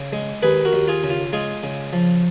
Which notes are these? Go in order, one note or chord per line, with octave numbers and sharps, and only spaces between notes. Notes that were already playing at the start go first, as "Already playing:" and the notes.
Already playing: C#3
G#3
D#2 G#4 B4
F#4 A#4
D#2
F4 G#4
C#3
F4
G#3 F4 G#4
C#3
F3